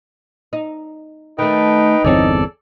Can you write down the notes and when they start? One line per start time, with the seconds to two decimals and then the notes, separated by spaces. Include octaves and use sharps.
0.53 D#4
1.38 D#3 A3 D#4 B4 G5
2.04 G1 E2 C4 G#4 A4 C#5 D5